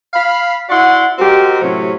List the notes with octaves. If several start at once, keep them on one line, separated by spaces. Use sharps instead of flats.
F5 B5
E4 F#4 D5 F#5 C6
G#3 C4 F#4 G4 A#4
A2 C3 F#3 C4 C#4